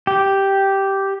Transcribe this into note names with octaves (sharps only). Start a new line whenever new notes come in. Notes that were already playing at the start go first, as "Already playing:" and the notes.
G4